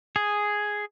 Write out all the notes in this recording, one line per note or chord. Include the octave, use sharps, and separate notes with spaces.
G#4